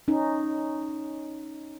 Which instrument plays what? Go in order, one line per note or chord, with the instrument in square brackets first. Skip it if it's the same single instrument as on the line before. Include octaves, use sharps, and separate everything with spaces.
[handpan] C#4 D#4